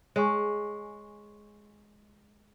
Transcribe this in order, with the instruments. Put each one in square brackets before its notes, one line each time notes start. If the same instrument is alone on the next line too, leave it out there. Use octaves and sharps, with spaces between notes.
[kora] G#3 [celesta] C#5 G#5 C#6